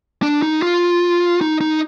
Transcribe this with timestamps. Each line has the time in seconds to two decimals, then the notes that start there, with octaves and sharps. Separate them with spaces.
0.23 D4
0.42 D#4
0.62 F4
1.41 D#4
1.61 D#4